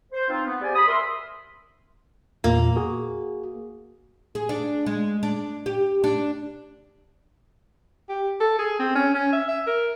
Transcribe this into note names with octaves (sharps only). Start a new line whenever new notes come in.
C5
C4 D#4 F4
B3
G4 G#4 C5 D5 G#5
B5 D#6
A#4 E5 C6
E2 A#2 A#3
F#4 G#4
G#4
D4
G#3
D4
G4
D4
G4
A4
G#4
C4
C#4
C#4
E5
E5
A#4